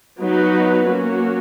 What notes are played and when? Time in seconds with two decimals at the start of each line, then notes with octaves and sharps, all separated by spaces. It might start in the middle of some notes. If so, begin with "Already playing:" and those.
0.20 F#3 B3 D#4 F#4 B4
0.88 F#3 A#3 C#4 F#4